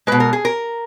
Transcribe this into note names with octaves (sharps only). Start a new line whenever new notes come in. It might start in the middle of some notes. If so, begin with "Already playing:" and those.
B2 G#3 B4
A#4
G#4
A#4